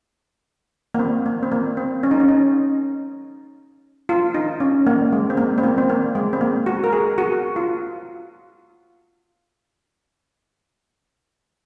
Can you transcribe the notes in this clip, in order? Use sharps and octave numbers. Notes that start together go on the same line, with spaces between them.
A#3
C4
A#3
C4
A#3
C4
C#4
D#4
C#4
D#4
F4
D#4
C#4
A#3
G#3
C4
A#3
C4
A#3
C4
A#3
G#3
C4
A#3
F#4
A#4
G#4
F#4
F4